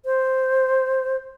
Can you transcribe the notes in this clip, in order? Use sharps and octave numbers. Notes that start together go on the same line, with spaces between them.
C5